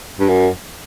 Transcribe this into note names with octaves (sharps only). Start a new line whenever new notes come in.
G2
F#2